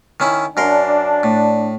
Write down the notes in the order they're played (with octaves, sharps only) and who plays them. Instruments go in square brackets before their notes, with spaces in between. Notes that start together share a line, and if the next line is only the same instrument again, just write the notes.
[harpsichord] D#3 C#4 E4
[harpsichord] F#2 A#4 C6 [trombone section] D4
[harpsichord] A2